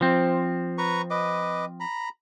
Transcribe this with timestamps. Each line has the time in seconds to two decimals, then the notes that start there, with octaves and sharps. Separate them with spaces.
0.01 F3 C4
0.78 B4 A#5 C#6
1.10 B4 D#5 D6
1.80 A#5 B5